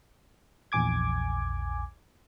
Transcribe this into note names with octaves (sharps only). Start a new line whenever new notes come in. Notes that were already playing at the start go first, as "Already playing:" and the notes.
A#1 E2 G#5 D6 G#6